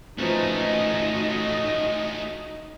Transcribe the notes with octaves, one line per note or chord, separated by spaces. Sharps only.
F3 A3 C#4 D#4 F#4 A#4 B4 D#5